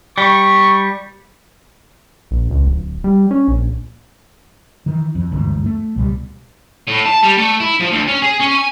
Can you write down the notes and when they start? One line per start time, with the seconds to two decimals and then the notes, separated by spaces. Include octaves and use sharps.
0.18 G3 C#6
2.31 A#1
2.51 C#2
2.66 D1
3.04 G3
3.31 C#4
3.48 A#1
4.86 D#3 E3
5.15 F2
5.31 G1 D2 G#2 E3
5.66 A3
5.96 C#2 B2 G3
6.87 A2
7.06 A5
7.23 G3
7.37 A3
7.60 E4
7.80 F3
7.92 D2
8.08 C#4
8.22 G#4
8.40 C#4
8.55 G#5